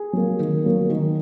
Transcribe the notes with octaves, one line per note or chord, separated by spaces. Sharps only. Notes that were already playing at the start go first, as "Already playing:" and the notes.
Already playing: G#4
F#3 A#3
D#3
F#3 A#3
D#3